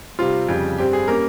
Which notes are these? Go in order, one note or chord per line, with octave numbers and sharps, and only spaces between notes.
C3 G3 C4 F4
F2 C#3 G3
G2 G3 C4 G4
G#4
G3 A#3 C#4 A#4